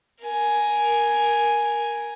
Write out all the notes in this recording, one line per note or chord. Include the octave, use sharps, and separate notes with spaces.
A#4 G#5